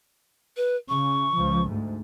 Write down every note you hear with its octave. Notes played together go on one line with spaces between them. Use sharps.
B4
C#3 C#6
C#2 F3
D2 G#2